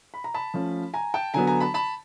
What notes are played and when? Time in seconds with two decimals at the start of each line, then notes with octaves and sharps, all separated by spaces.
0.14 B5
0.24 A#5
0.34 A5 B5
0.54 F3 A3 C#4
0.94 G#5 A#5
1.14 G5 A5
1.34 D3 F#3 B3 G#5 A#5
1.47 G#5 A#5
1.60 A5 B5
1.74 A5 B5